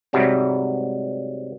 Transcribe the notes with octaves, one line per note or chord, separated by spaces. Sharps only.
G#2 C3 F#3 G3